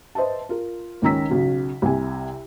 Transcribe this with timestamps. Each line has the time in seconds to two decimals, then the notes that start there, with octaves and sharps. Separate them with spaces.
0.15 B4 C5 D#5 E5 A5
0.49 F4 A#4
1.02 C#2 D#3 C#4 A#5 E6 B6
1.30 B1 C#3 F#3
1.82 C2 C3 G#5